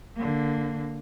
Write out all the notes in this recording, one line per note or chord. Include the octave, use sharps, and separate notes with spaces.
D3 A#3